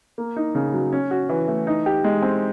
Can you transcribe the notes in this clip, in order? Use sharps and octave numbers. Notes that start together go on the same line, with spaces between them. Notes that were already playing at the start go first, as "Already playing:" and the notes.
A#3
D#4
C#3
F#3
C#4
F#4
E3
A3
D#4
G4
G#3
C4